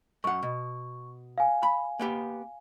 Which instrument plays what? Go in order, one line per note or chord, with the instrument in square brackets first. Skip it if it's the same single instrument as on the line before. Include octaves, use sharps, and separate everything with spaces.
[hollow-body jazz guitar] F#2 F#5 [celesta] C#6
[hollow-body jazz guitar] B2
[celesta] F5 G#5
[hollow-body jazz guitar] B5
A#3 B3 G4